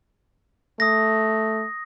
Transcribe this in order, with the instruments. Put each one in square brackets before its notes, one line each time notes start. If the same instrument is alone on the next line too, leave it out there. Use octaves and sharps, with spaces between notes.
[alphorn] A3 [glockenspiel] D#6 A#6